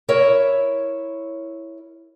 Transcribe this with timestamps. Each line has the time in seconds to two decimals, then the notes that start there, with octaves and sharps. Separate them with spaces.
0.08 E4 A#4 C#5 E5